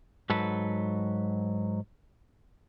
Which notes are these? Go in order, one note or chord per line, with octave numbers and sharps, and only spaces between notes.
G#2 F#3 A4 B4